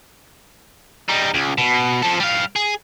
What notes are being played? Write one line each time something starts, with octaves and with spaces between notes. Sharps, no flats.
G3 D#4
C#2
B2
F3 A4
G3 F5
G#4